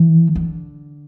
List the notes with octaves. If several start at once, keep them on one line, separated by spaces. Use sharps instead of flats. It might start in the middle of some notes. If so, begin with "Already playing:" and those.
Already playing: E3
D3